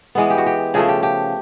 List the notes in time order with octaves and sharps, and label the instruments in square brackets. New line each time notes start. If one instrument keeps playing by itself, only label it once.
[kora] E3 G#3 B3
G4
F#4
G4
C#3 F3 A3 G#4
G4
G4